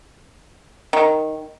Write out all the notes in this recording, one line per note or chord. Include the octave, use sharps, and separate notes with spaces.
D#3